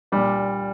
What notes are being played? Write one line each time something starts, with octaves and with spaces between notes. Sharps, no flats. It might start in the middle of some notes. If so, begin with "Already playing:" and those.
A#2 G3 D4